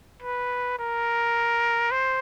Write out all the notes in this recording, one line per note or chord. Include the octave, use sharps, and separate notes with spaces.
B4
A#4
C5